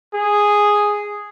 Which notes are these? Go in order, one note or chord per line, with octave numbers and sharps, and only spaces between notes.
G#4